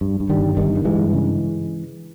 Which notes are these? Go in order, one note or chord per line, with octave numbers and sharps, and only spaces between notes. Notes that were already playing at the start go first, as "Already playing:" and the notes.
G2
G2
D#3 G3
G1
G1 D#3 G3
G2
E3 G#3
G2
C#3